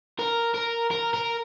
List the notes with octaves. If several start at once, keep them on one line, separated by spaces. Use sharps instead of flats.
A#4
A#4
A#4
A#4